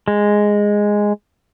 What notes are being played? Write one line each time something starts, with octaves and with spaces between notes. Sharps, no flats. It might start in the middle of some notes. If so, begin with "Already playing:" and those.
G#3